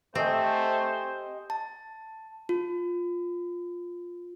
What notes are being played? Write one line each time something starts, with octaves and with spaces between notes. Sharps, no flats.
A3 C4 G4 C5 D#5 G#5
A5
F4